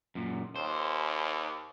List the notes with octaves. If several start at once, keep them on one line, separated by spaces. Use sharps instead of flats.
F#2 A#2
D#2 C5